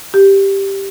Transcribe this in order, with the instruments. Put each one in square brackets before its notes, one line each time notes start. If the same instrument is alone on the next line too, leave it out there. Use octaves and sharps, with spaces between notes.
[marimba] G4